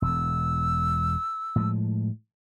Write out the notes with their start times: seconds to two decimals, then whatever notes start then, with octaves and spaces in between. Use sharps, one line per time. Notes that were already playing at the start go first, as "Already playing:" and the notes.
0.02 E1 E2 E6
1.56 A2 F3 G#3